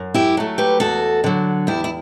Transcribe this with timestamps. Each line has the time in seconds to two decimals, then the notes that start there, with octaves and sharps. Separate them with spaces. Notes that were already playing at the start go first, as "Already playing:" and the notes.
Already playing: F#2
0.14 E4 G4
0.37 F#3 A3
0.58 G4 B4
0.80 E2 F#4 A4
1.24 D3 F#3
1.67 E2 E4 G4
1.84 E4